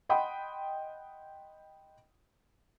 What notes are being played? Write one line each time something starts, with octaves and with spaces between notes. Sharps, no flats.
D#5 F#5 G5 B5 C6 D#6